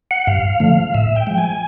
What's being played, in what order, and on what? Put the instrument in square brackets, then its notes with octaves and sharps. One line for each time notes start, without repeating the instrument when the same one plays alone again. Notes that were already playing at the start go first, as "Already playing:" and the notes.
[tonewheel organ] F#5
G2 F5
D3 F3 A3
A2 E5
G5
F3 G#3
G#5